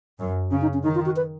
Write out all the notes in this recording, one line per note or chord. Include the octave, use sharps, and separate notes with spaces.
F#2
C#3 C#4
D#4
C#4
D#3 D#4
F4
F#4
B4